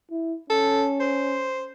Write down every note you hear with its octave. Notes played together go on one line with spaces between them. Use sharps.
E4
C#4 A4
C5